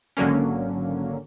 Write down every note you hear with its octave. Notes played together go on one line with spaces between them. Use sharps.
G#1 D3 F#3 A#3 C#4